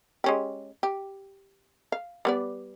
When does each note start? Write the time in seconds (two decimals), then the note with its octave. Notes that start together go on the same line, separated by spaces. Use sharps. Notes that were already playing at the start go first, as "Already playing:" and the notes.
0.24 G#3 C#4 G4
0.83 G4
1.92 F5
2.25 G3 B3 D5